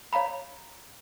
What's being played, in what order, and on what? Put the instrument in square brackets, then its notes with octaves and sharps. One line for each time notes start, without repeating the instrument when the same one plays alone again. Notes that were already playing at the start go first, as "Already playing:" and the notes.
[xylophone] C#5 F5 A#5 B5